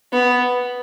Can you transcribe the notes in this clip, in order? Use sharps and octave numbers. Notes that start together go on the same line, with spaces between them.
B3